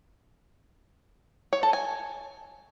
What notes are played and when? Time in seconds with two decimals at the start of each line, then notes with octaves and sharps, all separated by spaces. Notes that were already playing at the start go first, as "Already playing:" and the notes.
1.53 C#5
1.63 A4
1.73 G#5